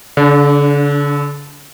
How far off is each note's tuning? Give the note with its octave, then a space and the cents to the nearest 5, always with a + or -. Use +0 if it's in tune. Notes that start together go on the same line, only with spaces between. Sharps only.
D3 -40 D4 +0